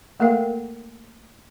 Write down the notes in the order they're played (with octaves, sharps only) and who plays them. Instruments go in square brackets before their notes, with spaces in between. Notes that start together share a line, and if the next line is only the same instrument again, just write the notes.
[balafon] A3 A#3 A4 A#4 F5 G5